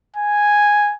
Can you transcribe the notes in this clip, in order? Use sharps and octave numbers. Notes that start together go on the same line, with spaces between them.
G#5